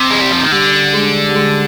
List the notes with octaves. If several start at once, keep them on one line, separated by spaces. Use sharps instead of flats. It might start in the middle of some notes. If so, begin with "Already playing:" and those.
Already playing: C3
G#3
G3
F3
D#3
D3 G3
G#3
G3
G#3